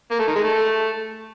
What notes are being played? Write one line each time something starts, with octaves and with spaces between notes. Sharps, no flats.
A#3
A3
D#3
G#3
A3